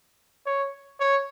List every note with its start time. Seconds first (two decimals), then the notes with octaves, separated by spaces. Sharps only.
0.46 C#5
1.00 C#5